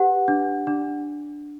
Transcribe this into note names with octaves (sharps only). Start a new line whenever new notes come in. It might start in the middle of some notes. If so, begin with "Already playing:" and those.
Already playing: G4 B4 F#5
D4
D4